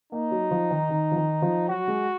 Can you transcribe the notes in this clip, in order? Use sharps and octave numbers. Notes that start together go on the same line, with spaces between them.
A#3 D#4
F#3
F3
D#3
D#3
F3
D#3
F3
F#3 F#4
G#3